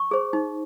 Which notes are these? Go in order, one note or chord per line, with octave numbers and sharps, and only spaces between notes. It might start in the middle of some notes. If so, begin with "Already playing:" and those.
Already playing: C#6
G#4 C5
D#4